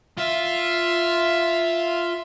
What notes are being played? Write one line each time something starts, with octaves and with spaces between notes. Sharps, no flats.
F4 E5